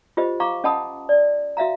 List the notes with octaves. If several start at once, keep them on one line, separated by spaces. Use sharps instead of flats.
F4 G4 C5 D#5
F5 A#5 C#6 D6
C#4 D#5 F#5 A5 B5 D#6
D5
F#4 E5 F5 A#5